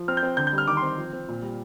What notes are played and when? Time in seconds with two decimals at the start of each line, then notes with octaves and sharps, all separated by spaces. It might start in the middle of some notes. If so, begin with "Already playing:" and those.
Already playing: F3
0.08 C4 F6
0.17 G6
0.23 C4
0.37 D3 G6
0.47 G6
0.53 G3
0.58 F6
0.67 D#3 D6
0.77 C6
0.82 C4
0.97 F3
1.13 C4
1.28 A#2
1.42 G3